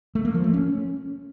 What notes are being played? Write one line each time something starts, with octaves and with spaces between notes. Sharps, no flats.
A3
A#3
F3
A3
C#4